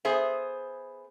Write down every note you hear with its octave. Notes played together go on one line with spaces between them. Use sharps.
B3 G#4 C5 E5